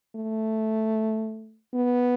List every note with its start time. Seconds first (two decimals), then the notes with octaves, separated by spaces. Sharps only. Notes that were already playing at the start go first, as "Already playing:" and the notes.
0.16 A3
1.74 B3